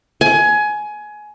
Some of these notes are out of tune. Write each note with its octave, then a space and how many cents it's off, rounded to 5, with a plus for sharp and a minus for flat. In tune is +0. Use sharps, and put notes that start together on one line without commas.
G#5 +20